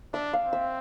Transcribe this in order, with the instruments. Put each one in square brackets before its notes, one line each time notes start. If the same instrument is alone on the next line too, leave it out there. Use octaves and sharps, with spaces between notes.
[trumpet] D4 [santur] E5
[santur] F5
[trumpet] C4
[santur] E5